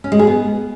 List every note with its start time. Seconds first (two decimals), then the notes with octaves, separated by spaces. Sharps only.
0.04 C#4
0.12 G#3
0.19 G#4
0.27 B3